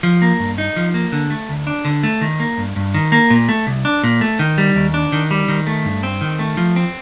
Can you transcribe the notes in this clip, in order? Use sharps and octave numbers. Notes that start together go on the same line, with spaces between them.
F3
A#3
G2
D#4
F3
A#3
D3
A3
D2
D4
D3
A3
D#3
A#3
G2
G2
D#3
A#3
A#2
A3
C2
D4
A#2
A3
D#3
G3
D#2
D4
D#3
G3
D#3
A3
G2
C4
D#3
A3
F3
C4